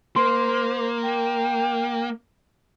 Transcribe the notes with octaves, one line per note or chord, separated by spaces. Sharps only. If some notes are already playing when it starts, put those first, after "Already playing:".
A#3 C5 C6
G5